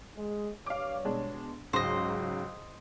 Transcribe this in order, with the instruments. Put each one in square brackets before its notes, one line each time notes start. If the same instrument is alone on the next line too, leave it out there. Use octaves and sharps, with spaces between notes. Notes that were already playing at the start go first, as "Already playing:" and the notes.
[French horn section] G#3
[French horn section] G2 G3 C#5 [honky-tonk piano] F5 D6
[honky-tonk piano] B2 G#3 D4
[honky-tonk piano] C#2 G#2 [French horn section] F#3 [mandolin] C5 D#5